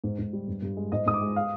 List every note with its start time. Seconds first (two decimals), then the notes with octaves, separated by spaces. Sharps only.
0.04 G#2
0.19 G#2
0.33 G3
0.48 G2
0.62 G2
0.77 G#3
0.92 G#2 D#5
1.06 G#2 D#6
1.14 D6
1.21 G#3
1.36 F5